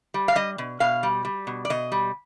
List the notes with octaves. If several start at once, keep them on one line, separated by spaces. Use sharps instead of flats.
G3
F5
G3 D#5
B2
B2 F5
G3
G3
B2
D5
B2 D#5
G3